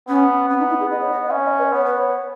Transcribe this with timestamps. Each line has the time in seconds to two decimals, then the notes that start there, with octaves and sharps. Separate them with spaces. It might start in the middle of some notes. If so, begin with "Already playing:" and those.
0.08 B3 C#4
0.49 B3 C#4
0.59 D#4
0.69 E4
0.80 G#4
0.90 B3 D#5
1.01 C#5
1.11 D#5
1.27 F#5
1.31 C#4 E5
1.45 D#5
1.58 B4
1.73 B3 C#5
1.85 B4
1.98 C#5